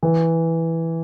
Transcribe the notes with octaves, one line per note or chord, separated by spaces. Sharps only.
E3